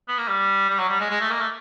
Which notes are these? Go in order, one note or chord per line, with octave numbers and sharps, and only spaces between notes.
B3
A#3
G3
G3
F#3
G3
G#3
G#3
A3
A#3
A3